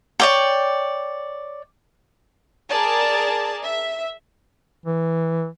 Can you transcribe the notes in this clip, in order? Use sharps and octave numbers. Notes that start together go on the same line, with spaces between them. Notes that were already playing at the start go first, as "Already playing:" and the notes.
C#5 D5 G5
G#4 A#4 D5 A5
E5
E3